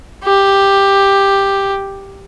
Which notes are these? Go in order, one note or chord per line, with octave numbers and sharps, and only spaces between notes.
G4